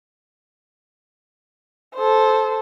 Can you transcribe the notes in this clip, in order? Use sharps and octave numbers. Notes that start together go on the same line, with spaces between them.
A4 C5